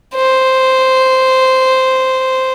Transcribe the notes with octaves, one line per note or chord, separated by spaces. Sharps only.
C5